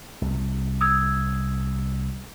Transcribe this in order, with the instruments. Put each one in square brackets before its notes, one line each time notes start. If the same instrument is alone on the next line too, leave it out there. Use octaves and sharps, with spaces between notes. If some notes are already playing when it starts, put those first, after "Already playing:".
[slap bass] C2
[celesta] D#6 E6 G#6